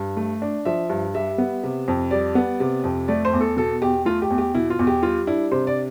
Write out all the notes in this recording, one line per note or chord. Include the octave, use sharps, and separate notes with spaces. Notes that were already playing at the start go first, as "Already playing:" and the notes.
Already playing: G2
A3
D4
F3 E5
G2
G3 E5
B3
C3
F2
G3 D5
B3
C3
F2
A3 D5
C5
E2
A4
B2 A4
E2 G4
A3 F4
G4
E2
G4
B2 E4
F4
E2
G4
G3 F4
D4 E4
C3 C5
D5